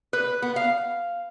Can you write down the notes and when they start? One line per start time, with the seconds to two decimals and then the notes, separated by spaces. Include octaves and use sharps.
0.13 B4
0.42 B3
0.56 F5